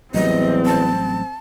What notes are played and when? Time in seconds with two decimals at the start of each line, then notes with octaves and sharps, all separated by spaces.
0.14 A1 E2 F#3 G3 C4 D#5
0.65 A5